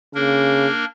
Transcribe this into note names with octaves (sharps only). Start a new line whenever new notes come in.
C#3 A#3 D4 A#4